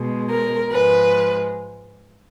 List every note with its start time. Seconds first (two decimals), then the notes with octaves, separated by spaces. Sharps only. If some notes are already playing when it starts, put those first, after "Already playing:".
Already playing: B2 G#3
0.28 A#4
0.70 G#2 F3 G#3 B4